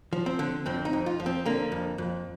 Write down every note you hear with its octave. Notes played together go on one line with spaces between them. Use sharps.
F3
C4
D3
F2 C4
D#4
F2
F4
F3
C4
D3 A#3
F2
F2